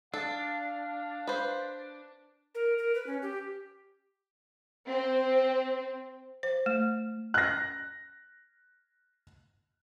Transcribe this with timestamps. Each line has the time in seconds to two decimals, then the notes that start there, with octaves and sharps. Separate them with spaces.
0.14 D4 A4 F5
1.27 B4 C5
2.55 A#4
2.78 A#4
2.95 B4
3.07 C#4
3.22 G4
4.88 C4
6.43 C5
6.66 A3
7.34 F#6 A#6